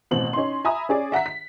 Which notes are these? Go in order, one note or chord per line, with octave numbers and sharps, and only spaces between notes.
A1 B2 C4 F#7
C#4 D#4 C6
E5 G#5 A#5 B5 D#6
C#4 G#4 D5
E5 F#5 A#5 B6
B6